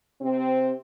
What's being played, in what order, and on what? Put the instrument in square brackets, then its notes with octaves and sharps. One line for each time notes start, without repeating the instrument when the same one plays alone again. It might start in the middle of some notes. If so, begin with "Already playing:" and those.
[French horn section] C3 C4